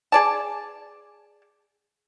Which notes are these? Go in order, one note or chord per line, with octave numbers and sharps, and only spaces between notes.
G#4 D5 A5